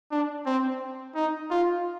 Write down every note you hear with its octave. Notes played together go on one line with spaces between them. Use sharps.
D4
C4
D#4
F4